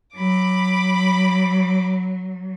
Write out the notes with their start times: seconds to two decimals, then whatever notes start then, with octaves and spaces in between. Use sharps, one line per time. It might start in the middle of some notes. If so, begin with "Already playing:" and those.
0.16 F#3 B5 D6